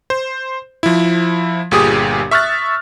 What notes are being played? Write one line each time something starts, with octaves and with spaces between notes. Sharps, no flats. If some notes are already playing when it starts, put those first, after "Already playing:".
C5
F3 E4
G1 A#2 G4 G#4 D#6
E5 C#6 F6 F#6 A6